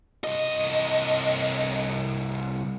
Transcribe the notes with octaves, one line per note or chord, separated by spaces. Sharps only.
C2 D#5